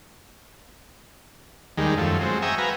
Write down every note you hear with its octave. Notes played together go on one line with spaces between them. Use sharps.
D#2 D#3 G3 G#3
F#2 F3 A3
F#3 G#3 C4
E5 G5 G#5 A#5 C#6 D#6
F#4 B4 F5 G#5 A#5